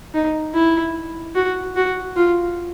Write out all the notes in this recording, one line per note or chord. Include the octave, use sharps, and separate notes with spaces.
D#4
E4
F#4
F#4
F4